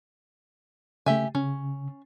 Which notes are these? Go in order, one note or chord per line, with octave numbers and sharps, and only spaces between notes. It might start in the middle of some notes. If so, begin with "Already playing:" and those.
C#3 A3 G4 E5 G#5
C#3 C#4